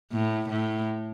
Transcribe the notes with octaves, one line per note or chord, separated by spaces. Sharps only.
A2
A2